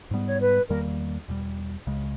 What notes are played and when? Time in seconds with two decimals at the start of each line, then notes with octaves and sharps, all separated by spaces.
0.11 G#2 G3 B3
0.25 C#5
0.40 B4
0.69 E2 D#3 G3 A#3 A#4
1.28 E2 B2 G3
1.87 C#2 C#3 G#3